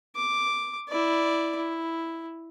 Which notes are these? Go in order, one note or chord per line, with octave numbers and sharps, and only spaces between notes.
D6
E4 D5
E4